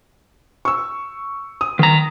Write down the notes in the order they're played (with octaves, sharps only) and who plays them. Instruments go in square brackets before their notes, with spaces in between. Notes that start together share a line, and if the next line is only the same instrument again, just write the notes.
[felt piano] C#6 E6
D#6
[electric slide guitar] D#3 A#5